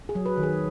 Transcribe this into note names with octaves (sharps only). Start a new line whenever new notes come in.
G#4
F#3
B4
D#3
G#4